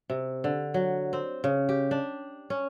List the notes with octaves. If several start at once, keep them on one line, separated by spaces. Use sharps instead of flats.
C3
D3
F#3
C4
C#3
G4
D4
C#4